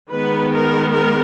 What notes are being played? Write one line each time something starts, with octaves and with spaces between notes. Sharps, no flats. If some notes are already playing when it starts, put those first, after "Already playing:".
D#3 G#3 B3 B4
A#4
A#4